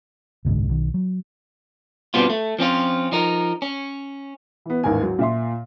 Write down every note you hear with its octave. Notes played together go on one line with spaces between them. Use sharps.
F#1 C2 G#2 D3
B1 D#3
F#3
G2 B2 G3 B3 C4 F4
A3
F3 C4 C#4 F4
F3 D#4 A#4
C#4
E3 B3
A1 D#2 G#2 A#4 G#5
F#3
A#2 E5 C6